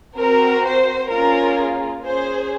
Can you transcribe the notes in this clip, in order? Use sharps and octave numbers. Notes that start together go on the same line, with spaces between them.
C4 F#4 A#4
C5
A#3 C#4 F4 G#4 A#4
C#4 G#4 C5